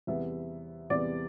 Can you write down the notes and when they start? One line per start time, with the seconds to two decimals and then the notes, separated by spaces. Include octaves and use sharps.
0.07 E2 C3 G3 B3 E5
0.90 E2 C3 G3 B3 D5